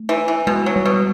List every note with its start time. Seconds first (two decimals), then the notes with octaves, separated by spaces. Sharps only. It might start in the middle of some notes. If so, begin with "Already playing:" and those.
Already playing: A3
0.09 E3
0.28 E3
0.47 B2 G#3
0.66 F#3
0.76 G3
0.86 B2